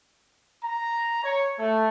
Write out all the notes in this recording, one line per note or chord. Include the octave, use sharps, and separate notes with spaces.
A#5
C#5
A3